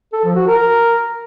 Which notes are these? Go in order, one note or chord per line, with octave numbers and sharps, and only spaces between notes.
A4
F3
F#4
A#4